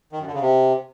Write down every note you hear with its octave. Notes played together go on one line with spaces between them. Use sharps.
D#3
F#2
D3
C#3
C3